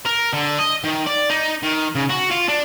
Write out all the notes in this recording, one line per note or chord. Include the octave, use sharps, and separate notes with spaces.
A#4
D3
D#5
D#3
D5
D#4
D#3
C#3
F#4
F4
D4